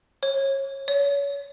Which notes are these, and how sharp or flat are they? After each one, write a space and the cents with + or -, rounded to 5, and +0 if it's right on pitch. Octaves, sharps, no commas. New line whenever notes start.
C#5 -25
C#5 +25